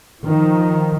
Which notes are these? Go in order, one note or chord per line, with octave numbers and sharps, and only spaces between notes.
D#3 F3